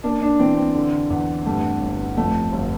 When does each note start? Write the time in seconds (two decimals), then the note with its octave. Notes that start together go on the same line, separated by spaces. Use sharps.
0.03 A#3 D4
0.22 D4
0.39 E3 C4
0.57 C4
0.75 D3
1.10 E2
1.46 G2 A3
1.81 G1
2.17 F2 A3
2.52 G1